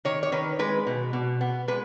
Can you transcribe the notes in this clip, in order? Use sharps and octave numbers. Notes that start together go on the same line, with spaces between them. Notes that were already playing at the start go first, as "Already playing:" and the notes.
D#3 C#5
C#5
D#3 B4
G#3 B4
B2
B2
B3
G#3 B4